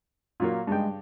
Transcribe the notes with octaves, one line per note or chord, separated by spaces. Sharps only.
A#2 F#3 A#3
G2 C#3 G#3 G5